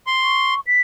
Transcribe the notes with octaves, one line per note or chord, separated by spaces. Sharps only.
C6
C#6
B6